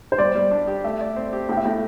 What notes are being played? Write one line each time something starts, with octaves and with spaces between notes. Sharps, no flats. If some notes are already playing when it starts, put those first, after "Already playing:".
C5
G3 D5
G3
D4
G4
A3 E5
D5
C4
G4
A2 G5
E5
A2 G5